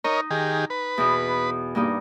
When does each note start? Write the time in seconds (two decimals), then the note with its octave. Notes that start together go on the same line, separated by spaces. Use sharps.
0.04 D#4 A#4 C#5 D#5
0.31 D#3 G4 G#4
0.70 B4
0.98 E2 B2
1.75 G2 A#3 D#4